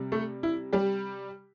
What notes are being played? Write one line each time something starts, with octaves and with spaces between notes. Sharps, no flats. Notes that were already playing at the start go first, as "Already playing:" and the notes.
Already playing: C3 G3
A3 A4
E4
G3 G4